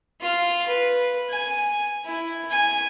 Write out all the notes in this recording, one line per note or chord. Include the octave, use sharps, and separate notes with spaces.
F4 F5
B4
G#5
E4
G#5